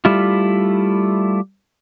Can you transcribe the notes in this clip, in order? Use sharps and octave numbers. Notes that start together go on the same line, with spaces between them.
G3 A3 E4 F4